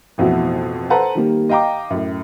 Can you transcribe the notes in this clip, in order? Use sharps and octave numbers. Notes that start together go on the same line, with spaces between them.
A1 F2 B2 E4 F#4
A4 B4 C5 F#5 A5 A#5
D#3 G3 A#3
D#5 F5 G5 A#5 D6
F#2 A2